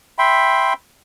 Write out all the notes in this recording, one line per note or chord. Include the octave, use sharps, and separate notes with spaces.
E5 G5 B5 C6